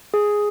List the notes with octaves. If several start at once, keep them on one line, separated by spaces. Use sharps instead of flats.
G#4